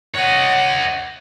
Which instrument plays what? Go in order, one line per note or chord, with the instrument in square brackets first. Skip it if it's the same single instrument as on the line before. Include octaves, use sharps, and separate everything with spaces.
[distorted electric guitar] C#5 D#5 [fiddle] F#5